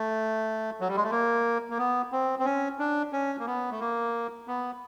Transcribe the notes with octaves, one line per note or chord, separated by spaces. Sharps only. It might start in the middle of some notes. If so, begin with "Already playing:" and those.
Already playing: A3
F#3
G3
G#3
A3
A#3
A#3
B3
C4
C4
C#4
D4
C#4
A#3
B3
A3
A#3
B3